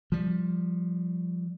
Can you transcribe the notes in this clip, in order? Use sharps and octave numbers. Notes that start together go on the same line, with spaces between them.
F3 G3